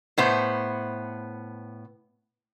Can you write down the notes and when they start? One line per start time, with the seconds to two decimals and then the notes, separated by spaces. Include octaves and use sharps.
0.18 A2 B3 C5